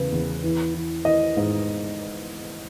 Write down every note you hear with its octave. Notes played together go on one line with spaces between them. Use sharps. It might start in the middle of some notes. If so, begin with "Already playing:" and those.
Already playing: E2 C#3 B4
E2
E3
E3
E3 D#5
G#2